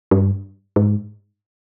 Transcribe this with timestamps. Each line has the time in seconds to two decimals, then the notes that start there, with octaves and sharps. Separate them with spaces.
0.11 G2
0.76 G#2